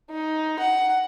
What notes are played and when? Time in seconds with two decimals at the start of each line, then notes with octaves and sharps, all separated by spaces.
0.10 D#4
0.59 F#5